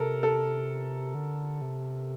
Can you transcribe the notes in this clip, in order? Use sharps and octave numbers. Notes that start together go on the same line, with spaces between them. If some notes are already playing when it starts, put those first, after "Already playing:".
Already playing: C3 A4 A#4
A4
D3
C3